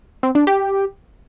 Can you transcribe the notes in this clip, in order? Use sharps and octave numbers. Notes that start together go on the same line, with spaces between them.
C4
D4
G4